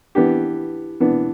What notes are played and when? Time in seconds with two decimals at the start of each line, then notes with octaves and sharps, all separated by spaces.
0.15 E3 B3 D4 G4
1.00 E3 B3 D4